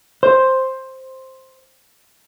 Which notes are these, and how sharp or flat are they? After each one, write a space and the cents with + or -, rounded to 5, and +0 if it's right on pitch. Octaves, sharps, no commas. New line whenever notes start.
C5 +5